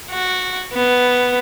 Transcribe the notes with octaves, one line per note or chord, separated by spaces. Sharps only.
F#4
B3